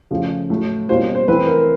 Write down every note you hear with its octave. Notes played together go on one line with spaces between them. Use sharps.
C#3 F3 A3 C#4 F4
A2 F#3 A3
B2 G3 A#3 C#4 F4 C5
C5
E3 A3 C4 E4 B4
A#4